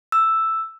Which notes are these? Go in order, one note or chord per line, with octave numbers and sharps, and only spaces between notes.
E6